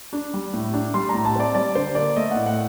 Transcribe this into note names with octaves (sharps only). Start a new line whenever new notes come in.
D4
G3
A2
D4
G3 C6
A2 A#5
A5
C4 D5
G3 D5
D3 C5
A#3 D5
A3 D#5
A2 F#5
F#5